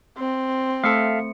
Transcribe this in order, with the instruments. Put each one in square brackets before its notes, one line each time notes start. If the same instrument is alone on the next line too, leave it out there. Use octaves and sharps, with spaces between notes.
[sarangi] C4
[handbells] A3 C#7 [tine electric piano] A4 E5 F5